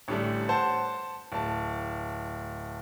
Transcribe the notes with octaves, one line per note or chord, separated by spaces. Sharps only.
A1 D3 G3 A3
C5 F#5 A5
D1 A5